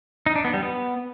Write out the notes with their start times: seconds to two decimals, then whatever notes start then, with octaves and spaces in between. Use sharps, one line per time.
0.26 D#4
0.36 D4
0.45 B3
0.54 G3
0.63 B3